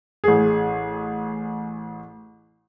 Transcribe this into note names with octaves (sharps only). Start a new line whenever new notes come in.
A1 G#4